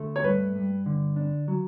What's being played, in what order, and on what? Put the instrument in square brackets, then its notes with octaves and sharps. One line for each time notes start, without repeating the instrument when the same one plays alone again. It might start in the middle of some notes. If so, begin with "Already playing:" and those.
Already playing: [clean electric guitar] D3 A3
[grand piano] C#5
[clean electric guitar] G2 [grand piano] B4
[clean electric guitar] G2
D3
D4
F#3